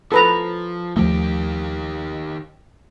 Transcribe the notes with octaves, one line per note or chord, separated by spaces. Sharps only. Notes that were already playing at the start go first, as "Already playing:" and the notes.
F3 A4 B4 A#5
D#2 D#3 F3 A3 G4